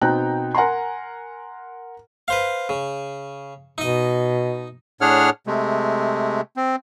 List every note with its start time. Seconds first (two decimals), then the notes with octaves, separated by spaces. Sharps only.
0.01 B2 C4 D#4 G5 A#5 F#6
0.55 A#4 F#5 G#5 A#5 C6
2.28 B4 C5 F5
2.69 C#3
3.78 B2 D#4 D#5
5.01 A2 D4 G#4 C#5 F#5 F6
5.47 C3 G#3 A3
6.57 C4